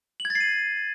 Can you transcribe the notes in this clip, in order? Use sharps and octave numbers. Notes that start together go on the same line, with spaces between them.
F#7
G#6
A6
C7
D#7